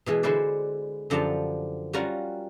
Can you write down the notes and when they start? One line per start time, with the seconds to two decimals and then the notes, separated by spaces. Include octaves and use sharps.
0.06 B2 E3 G#3
0.23 D3 G#3 E4 B4 C5 D5
1.10 F#2 D3 F3 G4 A5 A#5
1.93 G3 C#4 F4 F#4 A#4 F#5